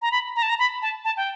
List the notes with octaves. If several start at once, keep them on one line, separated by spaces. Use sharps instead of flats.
A#5
B5
A#5
A5
A#5
B5
A5
A5
G5